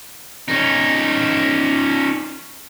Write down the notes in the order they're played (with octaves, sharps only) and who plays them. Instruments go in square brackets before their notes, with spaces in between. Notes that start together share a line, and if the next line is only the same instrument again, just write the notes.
[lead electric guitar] C#4 D#4